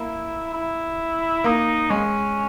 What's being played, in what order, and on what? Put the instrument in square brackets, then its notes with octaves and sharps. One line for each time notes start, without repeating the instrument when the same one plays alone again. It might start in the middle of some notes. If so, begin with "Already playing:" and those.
Already playing: [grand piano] A#3 [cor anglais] E4
[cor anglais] E4
[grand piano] A#3 [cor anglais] D#4
[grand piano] G#3 [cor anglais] C#4